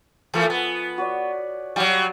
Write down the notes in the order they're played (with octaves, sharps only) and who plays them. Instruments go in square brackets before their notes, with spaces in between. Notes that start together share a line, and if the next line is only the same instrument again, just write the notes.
[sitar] E3 A3 A#3 [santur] F3 A4 D#6
[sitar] B3 [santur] G#5
[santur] F#4 C#5 D5
[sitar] F#3 G3 [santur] F#4 F5 A5